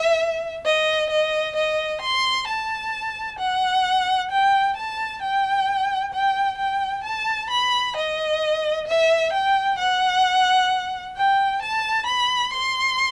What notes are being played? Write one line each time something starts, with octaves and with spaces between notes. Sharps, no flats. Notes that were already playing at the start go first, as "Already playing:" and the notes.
Already playing: E5
D#5
D#5
D#5
C6
A5
F#5
G5
A5
G5
G5
G5
A5
B5
D#5
E5
G5
F#5
G5
A5
B5
C6